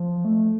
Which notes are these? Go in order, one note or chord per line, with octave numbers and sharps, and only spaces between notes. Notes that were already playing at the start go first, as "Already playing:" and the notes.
Already playing: F3
A3